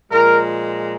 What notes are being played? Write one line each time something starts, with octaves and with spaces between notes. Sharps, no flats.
A#2 F3 G#3 A#4